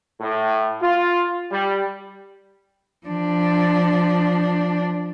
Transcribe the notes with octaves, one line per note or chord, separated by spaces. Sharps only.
A2
F4
G3
F3 D4